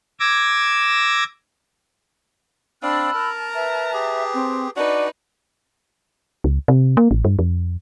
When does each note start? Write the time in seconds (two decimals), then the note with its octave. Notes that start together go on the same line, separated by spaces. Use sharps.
0.20 D6 E6 G#6 A#6
2.83 C4 D4 D5 F5 B5 E6 F#6
3.14 A#4 A5 A#5
3.55 B4 E5
3.93 G4 G#4
4.34 C4
4.76 D4 D#4 F#4 B4 D5 F#5
6.44 C#2
6.68 C3
6.97 A#3
7.11 A1
7.25 G2
7.39 F2